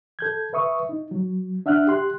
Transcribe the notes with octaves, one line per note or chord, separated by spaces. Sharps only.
A4 G6 G#6
B4 E5 C#6 D#6
D#4
F#3
D4 E5 F#5 F6 F#6
G4 C6 F#6